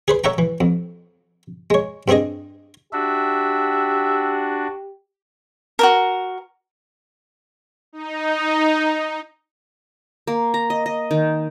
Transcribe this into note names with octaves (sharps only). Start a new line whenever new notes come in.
G#4 B4 C5
A4 C#5 E5 F#5 G5 A#5
E3
F2
G#3 C#5
G2 C4 D4 G#4 D#5
D4 F#4 G4 E5
F#4 A4 A#4
D#4
A#3
A#5
D#5
D#5
D#3